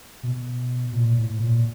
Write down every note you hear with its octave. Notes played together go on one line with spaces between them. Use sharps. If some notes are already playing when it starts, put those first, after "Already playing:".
B2
A#2
A2
A#2